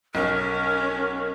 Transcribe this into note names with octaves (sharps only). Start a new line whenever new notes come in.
B1 C#4 A#4